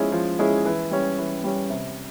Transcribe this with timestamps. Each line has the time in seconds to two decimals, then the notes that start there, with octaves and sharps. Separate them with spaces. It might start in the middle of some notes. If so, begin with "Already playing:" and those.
Already playing: F3 G#3 C#4 E4 G#4
0.12 F3
0.39 G#3 C#4 E4 G#4
0.65 E3
0.91 G3 C#4
1.18 E3
1.44 G3 C#4
1.70 C3